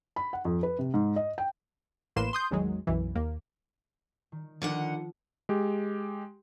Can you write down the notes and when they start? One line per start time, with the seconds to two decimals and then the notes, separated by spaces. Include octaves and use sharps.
0.16 B5
0.33 F#5
0.45 F2
0.63 B4
0.79 C3
0.94 G#2
1.16 D#5
1.38 G5
2.16 A1 A2 A#3 B4 C6 E7
2.33 C6 D#6 G6
2.51 A1 E2 D#3 F#3 G#3
2.87 B1 F#2 E3
3.15 D#2 A#3
4.32 D#3
4.62 D3 D#3 F3 F#5
5.49 G#3 G4